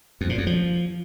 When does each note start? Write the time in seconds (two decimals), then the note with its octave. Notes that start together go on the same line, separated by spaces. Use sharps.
0.21 F2
0.29 A#2
0.38 F2
0.47 F3